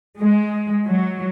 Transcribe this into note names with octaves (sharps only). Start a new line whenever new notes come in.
G#3
F#3